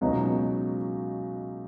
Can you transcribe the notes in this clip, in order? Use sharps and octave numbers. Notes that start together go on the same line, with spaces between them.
C#2 B2 F#3 B3 D#4